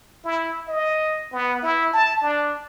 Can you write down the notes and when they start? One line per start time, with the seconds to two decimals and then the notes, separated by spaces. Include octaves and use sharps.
0.24 E4
0.68 D#5
1.32 B3
1.62 E4
1.93 A5
2.22 D4